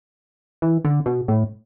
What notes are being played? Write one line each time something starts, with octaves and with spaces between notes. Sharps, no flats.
E3
D3
B2
A2